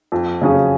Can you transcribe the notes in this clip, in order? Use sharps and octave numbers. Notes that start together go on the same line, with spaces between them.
F2
C#3 F#3 C#4 G#4